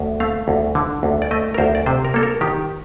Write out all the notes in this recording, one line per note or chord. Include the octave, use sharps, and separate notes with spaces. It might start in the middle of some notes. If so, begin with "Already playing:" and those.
Already playing: D2
A3 F5
D2
D3
D2
D5
A3 D#5
A#4
D2 C5
D5
C3 C5
A#4
A#3 A4
A#4
D#3 G4